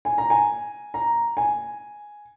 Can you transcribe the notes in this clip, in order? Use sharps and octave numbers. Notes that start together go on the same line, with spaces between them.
G#5
A#5
G#5
A#5
G#5